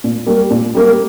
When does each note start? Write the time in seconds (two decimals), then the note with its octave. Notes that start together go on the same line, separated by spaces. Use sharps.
0.04 A#2
0.26 G3 A#3
0.50 A#2
0.75 G3 A#3